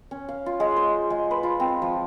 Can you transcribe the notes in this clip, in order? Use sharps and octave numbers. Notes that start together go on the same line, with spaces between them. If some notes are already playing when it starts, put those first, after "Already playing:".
C#4
F5
F4
G#3
C5
G#3
B4
F4
C4
F3